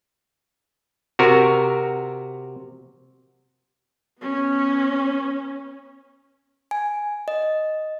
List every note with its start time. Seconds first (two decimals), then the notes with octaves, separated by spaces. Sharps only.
1.19 C3 F#4 A#4
4.20 B3 C#4
6.71 G#5
7.28 D#5